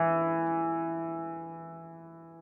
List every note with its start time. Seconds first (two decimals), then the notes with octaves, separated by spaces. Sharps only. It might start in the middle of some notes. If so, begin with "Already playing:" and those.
Already playing: E3